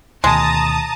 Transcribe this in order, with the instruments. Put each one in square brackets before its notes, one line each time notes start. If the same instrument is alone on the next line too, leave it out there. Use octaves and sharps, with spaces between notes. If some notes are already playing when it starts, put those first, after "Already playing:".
[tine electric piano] D2 B2 D#3 [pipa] G#3 [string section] A5 A#5 D#6